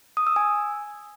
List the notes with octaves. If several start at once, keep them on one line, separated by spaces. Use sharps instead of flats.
D#6
E6
G#5